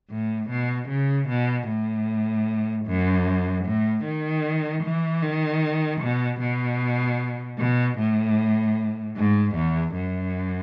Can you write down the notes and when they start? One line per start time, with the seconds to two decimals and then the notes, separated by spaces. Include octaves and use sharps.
0.10 A2
0.50 B2
0.89 C#3
1.29 B2
1.68 A2
2.86 F#2
3.65 A2
4.04 D#3
4.84 E3
5.22 D#3
6.01 B2
6.40 B2
7.59 B2
7.99 A2
9.17 G#2
9.56 E2
9.95 F#2